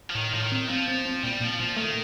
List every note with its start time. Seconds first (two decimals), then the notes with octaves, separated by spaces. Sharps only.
0.10 F3
0.15 A2 D#3
0.34 A2 F3
0.42 D#3
0.52 C4
0.69 F3 C4
0.88 C4
1.05 C4
1.23 A#2 G3
1.41 A#2 F3
1.60 A#2 F3
1.76 D#3 A3